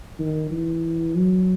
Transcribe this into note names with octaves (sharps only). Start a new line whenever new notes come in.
D#3
E3
F#3